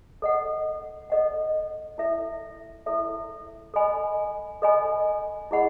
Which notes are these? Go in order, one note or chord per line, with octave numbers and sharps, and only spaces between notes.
A4 D#5 F#5
A4 D#5 F#5
E4 A4 E5
E4 A4 E5
A4 D#5 G#5 B5
A4 D#5 G#5 B5
E4 G#4 D#5 F#5 B5